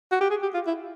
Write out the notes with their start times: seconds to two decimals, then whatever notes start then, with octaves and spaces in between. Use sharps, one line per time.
0.12 F#4
0.21 G4
0.31 G#4
0.42 G4
0.54 F4
0.67 E4